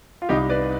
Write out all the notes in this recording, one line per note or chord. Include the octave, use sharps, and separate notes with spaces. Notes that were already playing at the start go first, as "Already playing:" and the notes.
F4
C2 D#4 G4
B4 D5